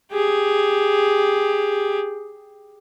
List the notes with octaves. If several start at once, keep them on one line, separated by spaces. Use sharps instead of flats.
G4 G#4